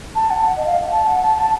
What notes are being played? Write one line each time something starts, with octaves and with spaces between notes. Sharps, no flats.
A5
F#5
D#5
F5
A5
F#5
A5
A5